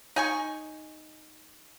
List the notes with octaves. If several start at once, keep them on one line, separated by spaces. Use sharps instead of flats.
D#4 G#5 C#6